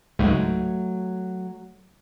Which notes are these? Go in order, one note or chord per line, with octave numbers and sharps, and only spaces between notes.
C#2 G#2 F#3 A3